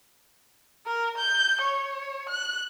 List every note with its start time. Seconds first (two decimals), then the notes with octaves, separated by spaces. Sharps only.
0.86 A#4
1.17 G6
1.62 C#5
2.29 F#6